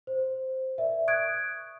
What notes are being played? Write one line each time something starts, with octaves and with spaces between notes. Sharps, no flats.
C5
A#4 D5 E5
C#6 D#6 F#6 G#6 D7